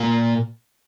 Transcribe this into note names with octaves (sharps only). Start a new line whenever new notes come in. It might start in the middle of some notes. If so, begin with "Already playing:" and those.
Already playing: A#2 A#3